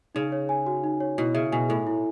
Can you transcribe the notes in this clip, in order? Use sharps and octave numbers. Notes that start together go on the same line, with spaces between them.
C#3 D#4
C#5
G#5
F#4
D#4
C#5
B2 E4
C#3 E5
B2 G#5
A2 A4
E4